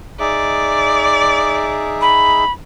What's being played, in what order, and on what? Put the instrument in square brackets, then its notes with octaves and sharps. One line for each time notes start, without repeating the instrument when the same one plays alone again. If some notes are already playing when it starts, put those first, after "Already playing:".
[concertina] D#4 G#4 E5 [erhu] D5
[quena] B5